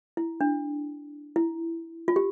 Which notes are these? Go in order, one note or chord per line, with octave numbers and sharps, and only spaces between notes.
E4
D4
E4
F4
G4